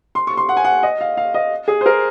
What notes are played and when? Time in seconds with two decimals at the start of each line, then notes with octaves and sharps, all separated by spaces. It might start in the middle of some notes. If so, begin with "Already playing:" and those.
0.15 C6
0.27 C#6
0.37 C6
0.49 F#5
0.57 G#5
0.64 F#5
0.83 D#5
1.01 F5
1.17 F5
1.34 D#5
1.68 G#4
1.81 C5
1.86 A#4